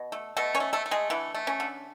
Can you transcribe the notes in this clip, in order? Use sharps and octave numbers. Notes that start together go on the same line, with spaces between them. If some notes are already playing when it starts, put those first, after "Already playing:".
Already playing: B2
A3
B2 A3 A4
C#4 C#5
A3
A3 A4
A3
G#3 G#4
D3 E3 E4
A3
C#4
D3